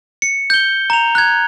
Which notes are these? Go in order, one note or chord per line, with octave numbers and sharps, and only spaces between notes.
C#7
G6 G7
A#5 F7
F#6 G#6